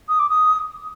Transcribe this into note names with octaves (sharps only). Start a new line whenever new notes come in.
D#6
D6
D#6